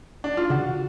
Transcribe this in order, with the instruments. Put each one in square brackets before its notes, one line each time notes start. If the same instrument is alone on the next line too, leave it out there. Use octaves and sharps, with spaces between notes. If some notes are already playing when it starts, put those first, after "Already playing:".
[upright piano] D4
F4
[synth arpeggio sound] C#3 [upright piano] F#4